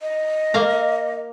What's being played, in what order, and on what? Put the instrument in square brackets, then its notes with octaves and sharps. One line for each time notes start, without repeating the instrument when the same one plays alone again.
[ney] D#5
[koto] A#3 F5 A#5